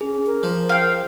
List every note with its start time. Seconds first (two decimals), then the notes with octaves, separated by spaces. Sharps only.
0.01 C#4 G#4
0.26 A#4
0.43 F3
0.69 F5 G5